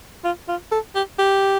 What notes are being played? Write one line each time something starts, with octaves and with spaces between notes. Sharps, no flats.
F4
F4
A4
G4
G4